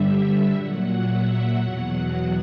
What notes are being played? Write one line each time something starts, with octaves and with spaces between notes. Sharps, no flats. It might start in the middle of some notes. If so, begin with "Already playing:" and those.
Already playing: G2 D3 G3 E5
A#2 F#3 F#5
E5
E2 B2 F#3 F#5
F#5